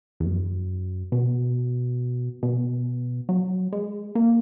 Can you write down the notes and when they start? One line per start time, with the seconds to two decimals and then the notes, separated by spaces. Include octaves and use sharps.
0.20 E2
0.25 F#2
1.12 B2
2.43 B2
3.29 F#3
3.72 G#3
4.15 A#3